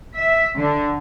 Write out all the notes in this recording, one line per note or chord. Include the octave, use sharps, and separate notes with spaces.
E5
D3